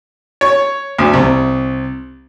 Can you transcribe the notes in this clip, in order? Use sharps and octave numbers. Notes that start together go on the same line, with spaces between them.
C#5
D2
C2